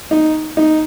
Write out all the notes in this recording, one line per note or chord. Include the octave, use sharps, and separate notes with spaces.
D#4
D#4